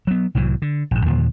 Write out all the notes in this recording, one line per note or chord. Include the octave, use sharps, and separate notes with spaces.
F#3 B3
C2 A2 E3 F#3
D3
A#1 G#2
D#2 A#2 D3 F3